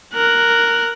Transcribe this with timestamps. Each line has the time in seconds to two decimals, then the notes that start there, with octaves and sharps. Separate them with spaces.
0.14 A#4 F#6